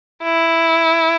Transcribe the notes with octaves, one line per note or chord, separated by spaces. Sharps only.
E4